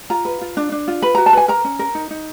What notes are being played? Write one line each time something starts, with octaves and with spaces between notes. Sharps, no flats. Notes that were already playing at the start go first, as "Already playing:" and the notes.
F4 A#5
B4
F4
D4
D4
F4
B4 B5
F#4 A#5
A5
B4 G#5
A#4 A#5
C#4
A#4
D#4
D#4